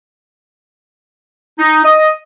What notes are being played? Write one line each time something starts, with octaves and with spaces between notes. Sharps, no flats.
D#4
D#5